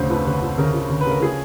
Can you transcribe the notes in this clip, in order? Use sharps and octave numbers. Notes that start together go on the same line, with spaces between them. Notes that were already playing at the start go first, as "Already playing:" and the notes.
Already playing: D2 C#3 C5
F2 B4
C#3 B4
F2
C#3 A#4
F2
C#3
B4
C#3
A#4
F3 G#4